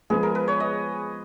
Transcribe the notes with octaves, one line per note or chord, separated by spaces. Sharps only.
F3 G#3 B3 G#4
A#4
B4
C#5
D#5